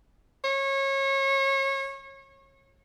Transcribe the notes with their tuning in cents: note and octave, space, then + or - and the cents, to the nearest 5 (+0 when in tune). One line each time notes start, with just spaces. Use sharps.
C#5 -30